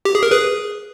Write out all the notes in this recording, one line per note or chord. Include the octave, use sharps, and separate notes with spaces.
G4
G#4
A#4
G#4 B4